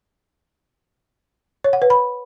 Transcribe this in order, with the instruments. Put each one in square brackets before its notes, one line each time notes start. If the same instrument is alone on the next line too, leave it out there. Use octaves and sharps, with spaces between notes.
[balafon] C#5
F#5
B4
B5